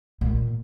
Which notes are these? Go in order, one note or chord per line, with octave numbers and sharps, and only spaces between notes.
A#2